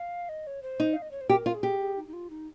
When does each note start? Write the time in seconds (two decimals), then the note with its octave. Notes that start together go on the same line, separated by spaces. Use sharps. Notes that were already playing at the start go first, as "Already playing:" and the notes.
Already playing: F5
0.29 D#5
0.47 C#5
0.63 C5
0.80 D#4
0.93 F5
1.02 D#5
1.11 C#5
1.21 C5
1.29 G4 A#4
1.46 F4
1.55 G#4
1.63 G4
1.80 G#4
1.97 D#4
2.08 D#4
2.13 F4
2.30 D#4